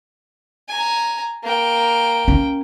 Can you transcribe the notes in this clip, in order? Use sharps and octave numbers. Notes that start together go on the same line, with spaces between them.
G#5 A#5
A#3 G5
C#4